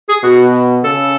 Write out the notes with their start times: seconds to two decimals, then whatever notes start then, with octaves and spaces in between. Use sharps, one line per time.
0.09 G#4
0.23 B2 F#4
0.84 C#3 A4